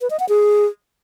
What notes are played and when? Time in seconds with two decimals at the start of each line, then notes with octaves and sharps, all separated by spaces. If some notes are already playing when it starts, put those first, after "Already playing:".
0.01 B4
0.10 D#5
0.20 F#5
0.29 G#4